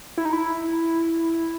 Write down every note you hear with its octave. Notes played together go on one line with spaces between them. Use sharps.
E4
D#4
E4